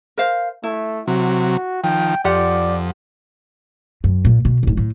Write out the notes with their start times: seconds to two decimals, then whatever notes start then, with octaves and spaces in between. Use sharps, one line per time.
0.18 A#4 C5 F5
0.64 A3 E4
1.08 C3 F#3 F#4
1.84 D#3 F3 G5
2.25 F2 F4 G4 D5 F#5
4.04 F#2
4.25 A#2
4.45 B2
4.63 F#1 G#2
4.77 A2